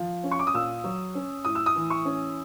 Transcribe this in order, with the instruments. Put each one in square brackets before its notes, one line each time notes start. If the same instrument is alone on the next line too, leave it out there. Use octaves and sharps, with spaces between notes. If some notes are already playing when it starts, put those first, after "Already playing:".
Already playing: [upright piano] F3
C#4
C#6
D6
D#6
A#2 E6
F#3
C#4
A2 D#6
E6
D#6
E3
C#6
C#4